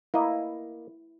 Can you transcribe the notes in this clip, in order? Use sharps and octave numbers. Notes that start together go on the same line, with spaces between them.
A#3 E4 D#5